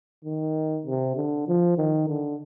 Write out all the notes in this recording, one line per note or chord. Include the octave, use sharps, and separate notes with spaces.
D#3
C3
D3
F3
D#3
D3